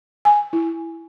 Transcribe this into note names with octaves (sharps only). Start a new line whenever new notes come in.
G#5
E4